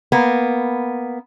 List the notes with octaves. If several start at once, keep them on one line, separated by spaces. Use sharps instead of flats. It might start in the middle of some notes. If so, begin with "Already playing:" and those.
A#3 B3